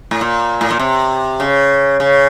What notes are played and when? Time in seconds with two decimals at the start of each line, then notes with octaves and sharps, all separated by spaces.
0.11 A2
0.21 A#2
0.61 A2
0.71 A#2
0.79 C3
1.40 C#3
2.00 C#3